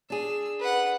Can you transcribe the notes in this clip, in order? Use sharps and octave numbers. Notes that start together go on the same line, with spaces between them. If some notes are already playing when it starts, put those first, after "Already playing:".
D4 G#4 E6
B4 F#5